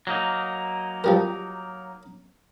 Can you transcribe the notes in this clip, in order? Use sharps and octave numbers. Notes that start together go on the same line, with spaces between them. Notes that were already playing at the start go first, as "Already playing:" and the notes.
F#3 A#3 D#4
F3 G3 A#4